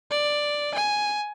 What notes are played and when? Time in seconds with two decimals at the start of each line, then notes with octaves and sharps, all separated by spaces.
0.11 D5
0.74 G#5